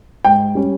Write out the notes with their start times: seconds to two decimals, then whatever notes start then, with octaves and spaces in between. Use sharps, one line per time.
0.25 G#2 G5
0.55 G3 C#4